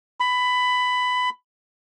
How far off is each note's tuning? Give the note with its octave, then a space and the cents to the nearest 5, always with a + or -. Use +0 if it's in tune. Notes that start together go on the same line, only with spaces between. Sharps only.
B5 +15